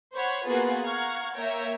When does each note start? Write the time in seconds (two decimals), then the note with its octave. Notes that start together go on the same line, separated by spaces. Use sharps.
0.13 C5 C#5 F#5 B5
0.46 A#3 B3 F4 F#4 G#4 B4
0.85 F5 F#5 A#5 C#6 F6 G#6
1.36 A#3 C#5 E5 G5 A#5